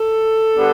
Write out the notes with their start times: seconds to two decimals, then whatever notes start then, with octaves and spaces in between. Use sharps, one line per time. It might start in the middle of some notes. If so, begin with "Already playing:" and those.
Already playing: A4
0.54 D3 G3 B3 D4